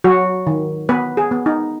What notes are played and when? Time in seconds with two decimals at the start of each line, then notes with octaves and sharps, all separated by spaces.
0.04 F#3 F#4
0.47 D#3
0.89 B3 B4
1.17 G#4
1.31 B3
1.46 D#4